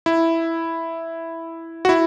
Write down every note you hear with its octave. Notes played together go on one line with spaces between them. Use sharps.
E4
F#4
E4